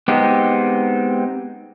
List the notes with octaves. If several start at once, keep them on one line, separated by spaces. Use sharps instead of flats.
G#3 B3 C4 D#4 G4